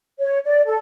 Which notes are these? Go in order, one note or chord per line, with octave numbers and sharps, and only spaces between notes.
C#5
D5
A4